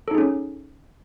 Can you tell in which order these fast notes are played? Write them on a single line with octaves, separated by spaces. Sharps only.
A4 D#4 G#4 C#4